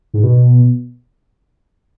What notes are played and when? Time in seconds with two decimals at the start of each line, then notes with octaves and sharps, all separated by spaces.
0.14 G#2
0.23 B2